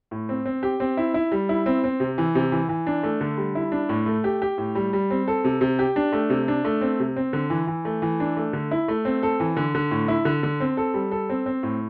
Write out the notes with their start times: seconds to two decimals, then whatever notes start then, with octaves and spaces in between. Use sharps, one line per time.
0.11 A2
0.29 C4
0.46 C4
0.63 G4
0.80 C4
0.97 E4
1.14 E4
1.32 G3
1.49 E4
1.66 C4
1.84 C4
2.00 C3
2.18 E3
2.35 C3
2.52 E3
2.69 E3
2.87 D4
3.03 A3
3.21 D3
3.37 G3
3.55 E4
3.72 D4
3.89 A2
4.06 A3
4.24 G4
4.42 G4
4.58 A2
4.75 G3
4.93 G3
5.10 C4
5.28 A4
5.44 C3
5.61 C3
5.79 G4
5.96 D4
6.13 A3
6.30 C3
6.48 D4
6.65 A3
6.81 C4
7.00 C3
7.16 C4
7.33 D3
7.50 E3
7.67 E3
7.85 A3
8.02 E3
8.20 D4
8.37 A3
8.53 D3
8.71 E4
8.88 A3
9.05 C4
9.23 A4
9.40 E3
9.56 D3
9.75 D3
9.91 A2
10.08 E4
10.25 D3
10.43 D3
10.60 C4
10.77 A4
10.94 G3
11.11 A4
11.30 C4
11.46 C4
11.63 A2